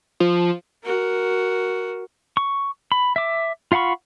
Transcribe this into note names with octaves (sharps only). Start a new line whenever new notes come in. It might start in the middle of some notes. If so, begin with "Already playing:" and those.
F3
F#4 A#4
C#6
B5
E5 D6
F4 F5 F#5 B5 C#6